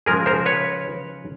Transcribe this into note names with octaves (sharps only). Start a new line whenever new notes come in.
C#3 F3 G#3 G#4 A#4
A#4 C5
B4 C#5